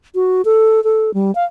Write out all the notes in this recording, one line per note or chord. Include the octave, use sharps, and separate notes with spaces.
F#4
A4
A4
G3
F5